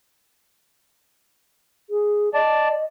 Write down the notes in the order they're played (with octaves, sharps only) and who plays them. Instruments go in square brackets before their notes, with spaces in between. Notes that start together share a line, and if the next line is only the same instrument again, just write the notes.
[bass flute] G#4
[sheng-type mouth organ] D5 A5 [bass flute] D#5